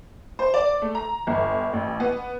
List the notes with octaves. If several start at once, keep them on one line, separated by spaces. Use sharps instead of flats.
C5
D5
A3
A#5
G1
A1
B3